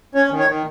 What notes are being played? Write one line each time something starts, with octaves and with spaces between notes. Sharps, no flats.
C#4 C#5
D#3
C#5
D#3